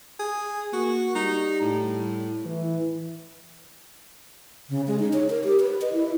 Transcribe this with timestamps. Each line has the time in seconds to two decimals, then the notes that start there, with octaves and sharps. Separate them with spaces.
0.19 G#4
0.73 A#3 F#4
1.15 G3 D#4
1.61 A2
2.45 E3
4.69 C#3
4.87 G#3
4.99 D#4
5.13 C#5
5.30 A#4
5.44 G4
5.60 B4
5.82 D#5
5.93 E4